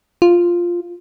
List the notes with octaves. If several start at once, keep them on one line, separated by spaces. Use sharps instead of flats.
F4